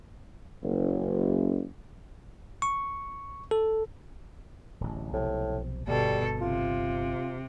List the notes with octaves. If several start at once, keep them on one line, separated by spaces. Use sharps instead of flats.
F#1
C#6
A4
D1 A1
B1 A2 C3 F3
G1 B2 G3 A4
C3 F4